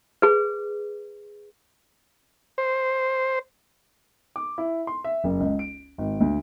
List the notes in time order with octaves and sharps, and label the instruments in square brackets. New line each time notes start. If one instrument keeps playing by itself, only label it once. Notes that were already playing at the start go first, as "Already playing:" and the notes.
[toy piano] G#4 B4
[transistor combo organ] C5
[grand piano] D6
E4
C6
E5
F#1
C#2
D7
G#1
D2